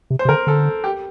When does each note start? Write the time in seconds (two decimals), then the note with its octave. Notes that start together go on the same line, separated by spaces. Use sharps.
0.10 C3
0.19 C5
0.25 C3
0.29 D3 A#4
0.47 D3 A4
0.84 G4